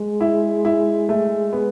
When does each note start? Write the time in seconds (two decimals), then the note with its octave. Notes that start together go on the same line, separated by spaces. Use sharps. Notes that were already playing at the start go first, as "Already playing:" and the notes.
Already playing: G#3
0.21 E4
0.65 E4
1.09 A3
1.53 B3